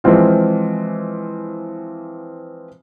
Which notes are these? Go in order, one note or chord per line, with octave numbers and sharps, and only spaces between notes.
E3 F3 G#3 C4 F4